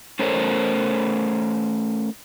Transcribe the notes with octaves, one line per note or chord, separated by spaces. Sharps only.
A3 C#4 A4 A#4 C5 C#5